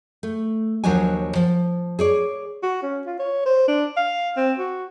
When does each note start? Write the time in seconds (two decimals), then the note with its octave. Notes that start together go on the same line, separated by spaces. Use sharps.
0.23 A3
0.84 D#2 F3 F#3 D4 C#5 G#5
1.35 F3
1.99 G#4 C#5 D5
2.63 F#4
2.83 C#4
3.07 F4
3.19 C#5
3.46 C5
3.68 D4
3.97 F5
4.37 C4
4.59 F#4